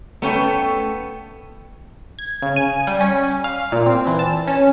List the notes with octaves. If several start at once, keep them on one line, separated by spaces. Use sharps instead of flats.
A3 B3 C#4 A4 C#5 G5
G#6
C#3
G#5
G3
C#4
F5
A#2
C4
E3
A5
C#4